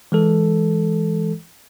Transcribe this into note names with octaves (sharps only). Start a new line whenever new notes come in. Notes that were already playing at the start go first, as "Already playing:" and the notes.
E3 G#3 A4